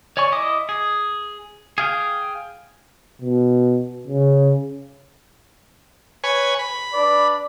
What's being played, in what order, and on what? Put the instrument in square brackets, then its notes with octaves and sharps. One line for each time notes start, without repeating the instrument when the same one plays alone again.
[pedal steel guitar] C#5 D5 G#5 C#6
E4 D#5 D6 D#6
G#4
G#4 F5 G5
[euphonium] B2
C#3
[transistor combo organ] B4 C#5 G#5
B5
[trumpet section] D4 B4 D5